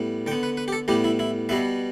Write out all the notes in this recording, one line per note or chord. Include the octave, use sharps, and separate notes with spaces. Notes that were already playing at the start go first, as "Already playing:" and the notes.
Already playing: A2 G3 B3
D3 B3 G5
B4
B4
G4
A4
A2 G3 B3 G4
E4
E4
B2 G3 B3 E5